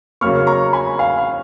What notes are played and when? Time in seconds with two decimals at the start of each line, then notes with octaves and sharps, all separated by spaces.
0.21 C#3 F#3 A#3 C#6 F6
0.47 A#5 C#6
0.73 G#5 B5
0.99 F5 G#5
1.18 F5